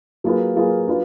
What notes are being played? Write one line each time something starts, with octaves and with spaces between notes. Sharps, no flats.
F#3 A#3 F4 G#4 B4
F#3 A#3 F4 G#4 B4
F#3 D4 F4 B4